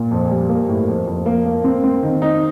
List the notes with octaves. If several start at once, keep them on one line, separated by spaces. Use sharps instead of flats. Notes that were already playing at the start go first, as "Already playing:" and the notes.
Already playing: A#2
F2
G3
A#3
A2
F2
F2
A#3
A#3
C4
C4
D#3
D#4